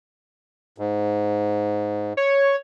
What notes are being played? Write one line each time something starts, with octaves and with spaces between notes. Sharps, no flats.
G#2
C#5